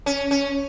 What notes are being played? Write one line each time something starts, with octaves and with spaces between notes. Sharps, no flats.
C#4
C#4